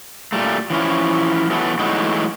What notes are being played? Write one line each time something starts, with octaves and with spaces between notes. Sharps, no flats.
A#2 G3 A3
E3 F3 C#4 E4
E3 F#3 A3 B3
E3 F#3 G#3 A3 D#4